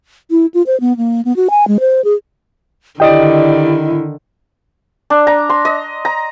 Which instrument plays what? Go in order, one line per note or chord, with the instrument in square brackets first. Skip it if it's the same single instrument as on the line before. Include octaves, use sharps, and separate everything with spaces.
[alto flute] E4
F4
C5
B3
A#3
B3
F#4
G#5
G#3
C5
G#4
[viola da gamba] D3 D#3 [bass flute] E4 [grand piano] G4 D5 [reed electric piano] D#5 G5
[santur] D4
A#5
C6
D#5
A#5